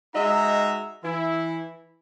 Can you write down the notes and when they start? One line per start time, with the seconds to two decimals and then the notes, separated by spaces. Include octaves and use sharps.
0.15 G#3 D#4 F#4 D#5 E5 A#5
1.03 E3 E4